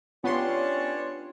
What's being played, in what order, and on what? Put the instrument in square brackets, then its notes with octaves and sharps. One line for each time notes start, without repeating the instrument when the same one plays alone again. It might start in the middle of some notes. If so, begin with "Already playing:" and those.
[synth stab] B3 C6 [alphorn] C#4 [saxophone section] D4 C#5 [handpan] F4 G4